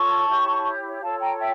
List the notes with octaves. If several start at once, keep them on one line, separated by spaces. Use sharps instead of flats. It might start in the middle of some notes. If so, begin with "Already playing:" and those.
Already playing: F4 A4 C#5 A5 C#6
E4 G4 C#5
F4 A4 C#5 F5 A5
G5 A#5
E5 G5